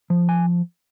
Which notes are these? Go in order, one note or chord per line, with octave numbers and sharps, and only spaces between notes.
F3
G#5